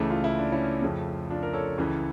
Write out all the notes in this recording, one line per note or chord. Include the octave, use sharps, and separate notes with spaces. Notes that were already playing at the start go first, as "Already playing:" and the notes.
Already playing: C#2 C#3 E3 A3
F4
E4
D4
C#4 E4
F2 C#3 F3 A3
D4 F4
A#4
A4 C#5
C#2 C#3 E3